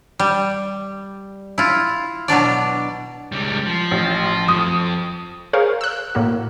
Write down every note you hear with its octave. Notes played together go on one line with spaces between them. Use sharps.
G3
E4 F4
B2 F#3 D4 D5
C#2 G3
F3
A1
F2 D#6
G#4 A#4 C5 C#5 F5
E6 F#6
A2 A#3 F#4